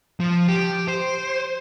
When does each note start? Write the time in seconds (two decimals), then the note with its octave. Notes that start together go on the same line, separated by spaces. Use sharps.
0.20 F3
0.48 G4
0.88 C5